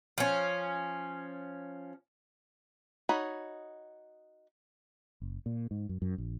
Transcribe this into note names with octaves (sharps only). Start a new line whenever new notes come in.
F3 C#4
D#4 F#4 C#5 B5
F#1
A#2
G#2
F#2
F#2
A#1